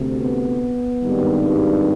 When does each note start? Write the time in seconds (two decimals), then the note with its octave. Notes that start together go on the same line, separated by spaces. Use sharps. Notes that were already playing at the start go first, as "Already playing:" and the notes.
Already playing: D2 C3
0.18 B3
1.01 G#1 G2 D#3 G3